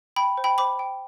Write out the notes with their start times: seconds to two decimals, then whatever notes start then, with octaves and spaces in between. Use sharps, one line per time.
0.16 G5 B5
0.37 C5
0.44 G5 B5
0.58 C5 B5 D6
0.79 G5